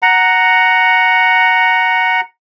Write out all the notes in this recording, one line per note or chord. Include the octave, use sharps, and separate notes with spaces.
F#5 A#5